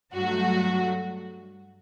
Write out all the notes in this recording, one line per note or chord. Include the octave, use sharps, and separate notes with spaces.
G2 F#3 A3 F#4